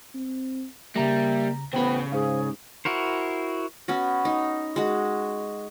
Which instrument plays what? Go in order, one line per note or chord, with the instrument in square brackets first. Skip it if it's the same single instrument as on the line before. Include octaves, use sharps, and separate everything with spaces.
[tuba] C4
[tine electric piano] C#3 A#5 A#6 [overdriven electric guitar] G3 [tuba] A#3 [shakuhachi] E5
[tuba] A1 [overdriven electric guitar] C#3 B5 [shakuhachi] B3 [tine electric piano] C5 G5
[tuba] G#2 [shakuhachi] G#4 [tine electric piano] C5 F5
[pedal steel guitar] E4 F#4 A#4 C5
[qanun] B3 C#4 F#4
D#4
G#3 F#4